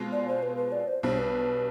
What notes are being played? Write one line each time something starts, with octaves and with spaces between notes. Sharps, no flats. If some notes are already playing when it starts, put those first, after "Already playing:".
Already playing: B2 G#3 C4 F4
D5
C5
B4
B4
D5
C5
B1 B2 G3 D4 C5
B4